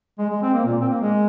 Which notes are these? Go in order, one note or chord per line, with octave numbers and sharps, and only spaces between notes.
G#3
G#3
C4
A#3
A#2
C4
A#3
G#3